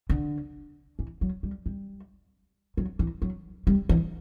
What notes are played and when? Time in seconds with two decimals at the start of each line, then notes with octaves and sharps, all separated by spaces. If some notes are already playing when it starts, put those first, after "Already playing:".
0.10 D3
0.99 E3
1.21 F#3
1.43 G3
1.66 G3
2.77 F#3
2.99 E3
3.22 F#3
3.67 G3
3.89 E3